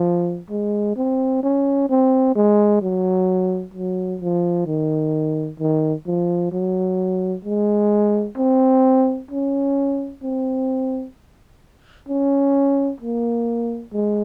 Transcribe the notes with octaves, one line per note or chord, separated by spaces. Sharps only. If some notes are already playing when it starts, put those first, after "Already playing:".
Already playing: F3
G#3
C4
C#4
C4
G#3
F#3
F#3
F3
D#3
D#3
F3
F#3
G#3
C4
C#4
C4
C#4
A#3
G#3